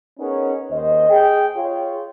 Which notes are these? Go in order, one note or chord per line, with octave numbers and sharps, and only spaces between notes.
B3 C#4 D#4 G#4 A#4 C#5
D#2 C5 D#5
G#4 G5
F4 G#4 C#5